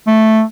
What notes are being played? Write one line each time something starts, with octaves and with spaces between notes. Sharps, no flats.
A3